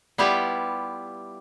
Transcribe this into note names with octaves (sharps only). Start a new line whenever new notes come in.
G3 B3 E4 F4 G4 B4